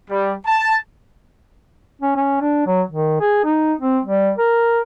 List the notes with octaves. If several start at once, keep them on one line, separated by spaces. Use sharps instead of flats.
G3
A5
C#4
C#4
D4
F#3
D#3
G#4
D#4
C4
G3
A#4